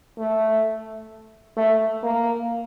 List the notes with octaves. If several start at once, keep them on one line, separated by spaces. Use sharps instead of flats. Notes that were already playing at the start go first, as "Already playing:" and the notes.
A3
A3
A#3